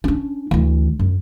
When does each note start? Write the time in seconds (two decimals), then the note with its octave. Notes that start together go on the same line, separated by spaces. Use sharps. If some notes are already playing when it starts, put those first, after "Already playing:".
0.04 C#4 D4
0.51 D2 E3
0.99 F#2